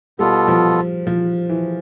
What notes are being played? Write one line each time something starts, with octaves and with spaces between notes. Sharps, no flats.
B2 G3 B3 F4 A4
F3
F3
E3